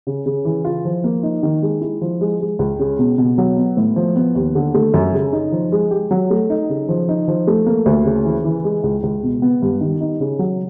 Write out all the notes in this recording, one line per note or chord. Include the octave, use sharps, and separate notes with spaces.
C#3
C#3
E3
F4
F3
A#3
D#4
D#3
G#3
E4
F3
G#3
G#3
C#2
C#3
B2
B2
F#3
B3
A2
F3
B3
D#2
D3
A3
F#2
C#3
D#4
F3
G#3
G4
F#3
A3
D#4
C#3
F3
D#4
F3
A3
A#3
D2
C#3
E3
E3
G#3
C#2
C#2
B2
B3
G2
D#3
D#4
C#3
F#3